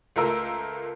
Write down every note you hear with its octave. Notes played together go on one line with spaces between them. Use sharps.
C#2 A3 F4 A#4 E6